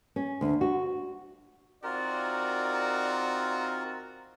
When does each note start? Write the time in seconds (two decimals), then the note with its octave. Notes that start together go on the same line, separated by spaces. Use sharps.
0.16 C#4
0.41 D2
0.61 F#4
1.84 C4 D#4 F4 F#4 A#4 D5